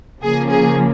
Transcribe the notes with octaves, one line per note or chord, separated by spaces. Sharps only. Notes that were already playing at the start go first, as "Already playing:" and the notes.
C#3 F3 A#3 G#4
G#4